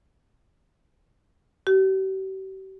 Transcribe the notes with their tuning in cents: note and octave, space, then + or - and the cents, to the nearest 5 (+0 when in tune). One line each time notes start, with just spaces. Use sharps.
G4 -45